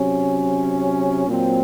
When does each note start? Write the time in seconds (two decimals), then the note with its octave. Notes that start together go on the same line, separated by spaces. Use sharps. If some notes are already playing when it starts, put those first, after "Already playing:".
Already playing: C3 F#3 C#4
1.28 A#2 F#3 C4